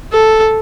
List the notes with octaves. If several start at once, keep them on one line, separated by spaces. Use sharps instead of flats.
A4